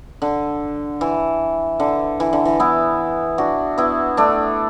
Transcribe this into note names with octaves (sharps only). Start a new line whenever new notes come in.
D3
E3
D3
E3
D3
E3
B3 E4
D4 F#4
B3 E4
A3 D4